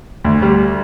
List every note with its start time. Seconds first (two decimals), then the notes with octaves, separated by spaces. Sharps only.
0.24 D2
0.42 G3